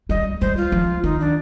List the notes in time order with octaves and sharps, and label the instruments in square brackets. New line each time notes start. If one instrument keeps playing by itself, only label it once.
[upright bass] G3 [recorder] D#5
[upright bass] G3 [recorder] C5
[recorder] F4
[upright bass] F3
[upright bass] D#3 [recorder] D#4
[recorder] D4